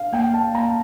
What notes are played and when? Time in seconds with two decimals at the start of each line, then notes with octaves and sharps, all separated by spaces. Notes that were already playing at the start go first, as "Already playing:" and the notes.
Already playing: D4 F5
0.13 A#3 G5
0.34 A5
0.54 A#3 A#5